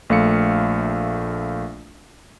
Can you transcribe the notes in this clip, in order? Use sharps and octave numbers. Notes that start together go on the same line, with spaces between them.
A#1 A3 F5 C#7